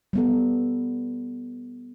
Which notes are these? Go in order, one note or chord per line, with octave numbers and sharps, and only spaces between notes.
G3 B3 A4